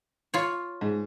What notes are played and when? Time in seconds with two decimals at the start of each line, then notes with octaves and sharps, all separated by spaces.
0.34 F4 C#5
0.81 G#2